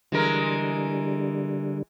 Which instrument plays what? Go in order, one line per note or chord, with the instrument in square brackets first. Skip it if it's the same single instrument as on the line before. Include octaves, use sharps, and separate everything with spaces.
[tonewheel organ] D3 G3 [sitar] E3 G#3 A#4